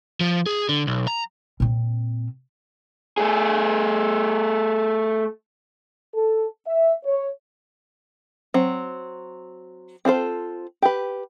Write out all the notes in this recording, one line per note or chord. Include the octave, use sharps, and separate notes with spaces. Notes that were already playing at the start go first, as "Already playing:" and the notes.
F3
G#4
D3
B1
A#5
A#2 C4
A3 G#4
A4
E5
C#5
F#3 C4
C4 F4 A4 C5
G4 B4